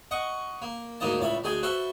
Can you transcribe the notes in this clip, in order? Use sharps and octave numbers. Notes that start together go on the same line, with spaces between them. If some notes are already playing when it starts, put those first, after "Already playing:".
D#5 F#5 C#6
A#3
D2 G#2 A#3 D#4 D#5 A5
C#2 A2 D5 E5 B5
D2 G#3 G#4 D5 G5
F#4 A4 B4 C5 E5 G5